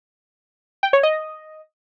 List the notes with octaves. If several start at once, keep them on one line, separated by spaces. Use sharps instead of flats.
G5
C#5
D#5